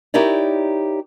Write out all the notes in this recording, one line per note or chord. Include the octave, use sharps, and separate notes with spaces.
D#4 E4 G4 A#4 C#5 D5